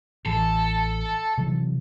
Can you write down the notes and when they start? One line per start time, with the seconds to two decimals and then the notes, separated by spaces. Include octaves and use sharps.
0.26 A1 E3 A4
1.38 C3 E3 F#3